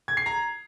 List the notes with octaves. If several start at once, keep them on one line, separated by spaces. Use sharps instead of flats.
G#6
C7
A#5